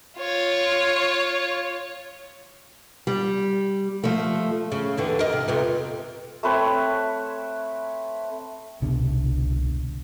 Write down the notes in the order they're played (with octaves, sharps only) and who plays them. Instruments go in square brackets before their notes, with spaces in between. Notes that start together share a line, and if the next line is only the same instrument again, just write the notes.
[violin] F4 C#5
[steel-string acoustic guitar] G3
F3 A3
[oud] C#3
D#2 D3 E3
A#4 D#5
C3
F2 C3 B3
[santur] A3 C4 B4 C#5
[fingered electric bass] F1 C2 B2 D3